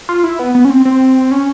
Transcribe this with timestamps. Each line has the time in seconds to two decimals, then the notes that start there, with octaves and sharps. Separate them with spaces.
0.09 F4
0.24 E4
0.39 B3
0.55 B3
0.65 C#4
0.70 C4
0.85 C4
1.31 C#4